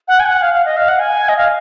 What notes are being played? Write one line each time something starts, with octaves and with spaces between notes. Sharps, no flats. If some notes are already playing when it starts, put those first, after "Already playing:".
F#5
G#5
F#5
F5
F5
D#5
F5
F#5
G#5
D#5
F5